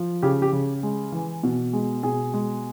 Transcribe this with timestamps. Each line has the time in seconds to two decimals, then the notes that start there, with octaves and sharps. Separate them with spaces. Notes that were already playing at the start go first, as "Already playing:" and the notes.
Already playing: F3
0.23 C#3 G4
0.42 G4
0.53 C#3
0.83 G#3
1.12 E3
1.43 B2
1.73 G#3
2.03 B2 G#4
2.34 G#3